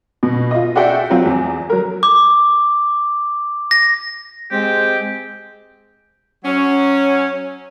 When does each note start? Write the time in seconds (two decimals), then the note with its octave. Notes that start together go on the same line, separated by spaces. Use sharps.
0.23 B2
0.51 F4 D#5
0.76 F#4 G#4 D5 E5 F#5 G5
1.10 F3 F#3 C4 F4
1.25 E2
1.70 F#3 A#4
2.03 D6
3.71 A#6
4.51 G#3 C4 G4
6.44 F#3 C#4